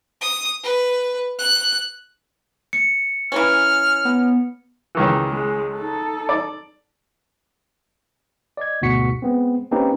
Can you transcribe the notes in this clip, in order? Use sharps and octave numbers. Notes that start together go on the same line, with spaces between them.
D#6
B4
F#6
C#7
E3 A#3 C#4 F6
B3
C#2 D#3 E3
G#3
D#4 A4
D5
D5 D#5 G#6
D2 G#2 B2 F#4 B6 C#7
G#3 B3 C4
A#3 C4 C#4 D#4 G4 B4